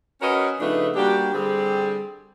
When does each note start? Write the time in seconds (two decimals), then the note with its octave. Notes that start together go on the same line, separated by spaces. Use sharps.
0.22 C#4 F#4 A#4 B4 C#5 D#5
0.60 C#3 F3 A3 B3 D4 D#4
0.96 G3 A#3 D4 F#4 G4
1.34 D3 G3 C4 G4 G#4